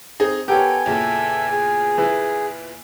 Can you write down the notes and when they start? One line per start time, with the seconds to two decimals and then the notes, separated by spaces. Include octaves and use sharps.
0.20 C4 D#4 G#4
0.48 B3 G4 A4 A#4 C#5 G#5
0.86 E2 A#2 C#3 A4 E5
1.51 G#4
1.98 E3